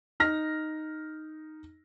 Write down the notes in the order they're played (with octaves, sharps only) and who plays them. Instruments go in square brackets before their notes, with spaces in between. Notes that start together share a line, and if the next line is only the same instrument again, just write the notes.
[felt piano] D#4 F6 A#6